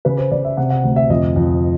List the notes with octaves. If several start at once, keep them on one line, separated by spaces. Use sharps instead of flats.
C#3 B4
C5
C#3 D5
E5
C3 F#5
F#5
D2
E5
F2 D#5
F2